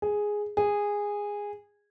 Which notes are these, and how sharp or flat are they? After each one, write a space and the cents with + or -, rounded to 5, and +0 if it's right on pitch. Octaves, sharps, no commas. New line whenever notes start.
G#4 +0
G#4 -15